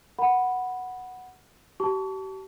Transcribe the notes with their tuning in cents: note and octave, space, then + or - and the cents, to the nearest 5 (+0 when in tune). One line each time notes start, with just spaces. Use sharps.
A#4 +0 F#5 +0 B5 +0
G4 -40 A5 +0 C#6 +40